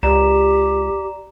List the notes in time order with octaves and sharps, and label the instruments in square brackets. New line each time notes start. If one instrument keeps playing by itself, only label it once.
[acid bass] C#2 [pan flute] G4 [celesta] D5 A#5 E7